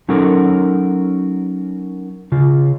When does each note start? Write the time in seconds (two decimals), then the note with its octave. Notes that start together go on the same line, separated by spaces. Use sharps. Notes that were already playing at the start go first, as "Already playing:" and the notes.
0.08 F#3 C#4 D#4 F#4 A4 A#4
2.32 C#3 F4